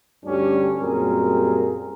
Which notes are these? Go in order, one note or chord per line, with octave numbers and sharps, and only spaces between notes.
D2 G2 G3 C#4 D4
F#2 A#2 G3 C4 G#4 A#4